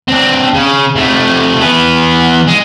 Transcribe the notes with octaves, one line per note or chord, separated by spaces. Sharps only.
C4 D4
C#3
C3 A3
E3 B3
G#3